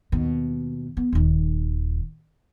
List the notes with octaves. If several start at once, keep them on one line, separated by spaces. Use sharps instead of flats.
D#2 B2
B3
D#1 D#2